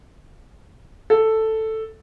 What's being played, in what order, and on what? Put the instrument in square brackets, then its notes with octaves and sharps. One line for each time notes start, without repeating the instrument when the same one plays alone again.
[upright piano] A4